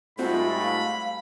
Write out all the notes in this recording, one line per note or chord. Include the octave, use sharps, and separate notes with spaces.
G#2 G3 A3 C4 F4 F#4 B5
F5